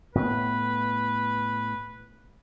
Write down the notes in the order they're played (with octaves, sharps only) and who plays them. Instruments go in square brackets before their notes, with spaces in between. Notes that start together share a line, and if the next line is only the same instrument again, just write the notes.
[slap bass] A2 B3 [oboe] B4